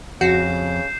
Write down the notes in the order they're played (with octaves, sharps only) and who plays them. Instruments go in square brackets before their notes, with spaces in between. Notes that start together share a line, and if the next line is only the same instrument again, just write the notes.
[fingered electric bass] F2 [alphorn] C#3 [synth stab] F#4 [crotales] G6 C7 E7